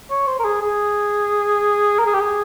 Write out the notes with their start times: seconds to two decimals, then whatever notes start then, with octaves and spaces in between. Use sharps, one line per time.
0.11 C#5
0.27 C5
0.39 A#4
0.45 G#4
0.61 G#4
1.99 A#4
2.06 G#4
2.13 G4
2.20 G#4